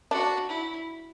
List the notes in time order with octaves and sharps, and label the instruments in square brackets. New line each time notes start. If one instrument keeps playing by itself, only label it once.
[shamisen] D4 [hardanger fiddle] F#4
[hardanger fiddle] E4